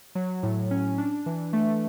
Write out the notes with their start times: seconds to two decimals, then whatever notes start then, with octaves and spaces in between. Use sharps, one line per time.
0.15 F#3
0.43 A2
0.71 C#4
0.98 D4
1.26 E3
1.53 A3